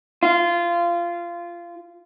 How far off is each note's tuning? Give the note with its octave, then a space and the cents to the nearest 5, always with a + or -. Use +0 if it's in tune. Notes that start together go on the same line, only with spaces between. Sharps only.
F4 -20